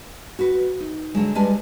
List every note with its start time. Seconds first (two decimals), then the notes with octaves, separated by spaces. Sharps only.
0.39 F#4 B4
0.80 D#4
1.14 D3 F#3 G#3
1.35 G3 G#3 B4 G#5 A5